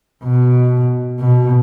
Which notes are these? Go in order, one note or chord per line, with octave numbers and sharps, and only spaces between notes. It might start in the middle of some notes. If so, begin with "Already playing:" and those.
B2
B2